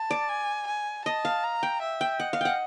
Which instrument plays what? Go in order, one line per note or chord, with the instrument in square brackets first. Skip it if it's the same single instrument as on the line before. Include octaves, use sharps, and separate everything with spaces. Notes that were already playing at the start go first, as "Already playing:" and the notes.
Already playing: [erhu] A5
[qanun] D5
[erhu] G#5
G#5
[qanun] D#5 [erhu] A5
[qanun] F5
[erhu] A#5
[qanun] G5
[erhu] E5
[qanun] G5
[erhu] D#5 [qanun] F#5
[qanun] F5
F#5 G5